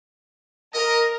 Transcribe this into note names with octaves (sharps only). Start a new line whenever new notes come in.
A#4 D#5